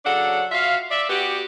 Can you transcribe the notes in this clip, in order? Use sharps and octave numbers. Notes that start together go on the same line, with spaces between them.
C#3 F#3 D4 A4 F#5
F4 F#4 E5 F5
D5 E5
B3 F#4 G4